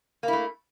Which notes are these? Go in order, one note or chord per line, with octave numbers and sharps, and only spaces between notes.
A3 A#3 E4